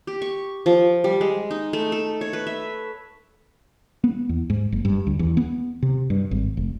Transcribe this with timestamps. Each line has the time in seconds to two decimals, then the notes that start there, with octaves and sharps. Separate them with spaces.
0.07 G4
0.22 C#6
0.66 F3
1.04 G3
1.21 G#3
1.51 D#4
1.73 A3
1.92 A4
2.21 C#5
2.33 B4
2.47 E5
4.04 B3
4.29 E2
4.50 G#2
4.72 F#1
4.85 G2
5.07 D2
5.19 E2
5.37 B3
5.83 C3
6.10 G2
6.31 G#1
6.57 F1